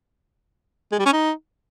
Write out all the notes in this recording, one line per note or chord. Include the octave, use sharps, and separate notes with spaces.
G#3
G3
C#4
D#4